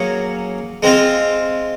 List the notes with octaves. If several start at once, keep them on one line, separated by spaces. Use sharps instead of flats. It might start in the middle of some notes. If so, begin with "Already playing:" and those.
Already playing: F#3 A#3 C#4 G#4 C#5
G#3 C4 F4